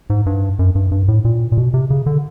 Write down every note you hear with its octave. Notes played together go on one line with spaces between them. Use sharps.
G#2
G2
F#2
G2
G2
A2
A#2
A#2
B2
C3
C#3
D3